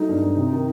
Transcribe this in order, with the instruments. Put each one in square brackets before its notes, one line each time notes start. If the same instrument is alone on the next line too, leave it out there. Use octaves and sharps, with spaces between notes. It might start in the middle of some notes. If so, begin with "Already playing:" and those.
Already playing: [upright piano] F#3 A3 [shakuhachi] D#4
[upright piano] G2
G2
C3
D#3